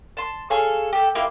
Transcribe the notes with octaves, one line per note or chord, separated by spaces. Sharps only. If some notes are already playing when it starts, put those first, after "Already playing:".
A5 C6
G#4 A4 C#5 F5
G4 A4
A#3 E4 F4 G4